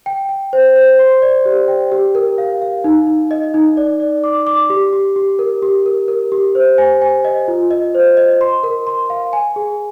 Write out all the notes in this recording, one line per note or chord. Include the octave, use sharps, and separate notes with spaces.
G5
G5
C5
C5
C6
D5
G4
G5
G4
A#4
F5
F5
D#4
D#4
D#5
D#4
D5
D5
D6
D6
G4
G4
G4
A#4
G4
A#4
A#4
G4
C5
G#5
G#5
D#5
F4
D#5
C5
D#5
C6
A#4
C6
F5
G#5
G#4